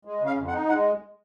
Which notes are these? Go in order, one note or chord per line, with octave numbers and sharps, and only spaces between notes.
G#3
C#3 F5
F2
F#5
D#4
G#3 F#5